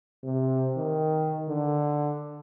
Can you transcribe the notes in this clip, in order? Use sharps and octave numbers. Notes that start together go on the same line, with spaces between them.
C3
D#3
D3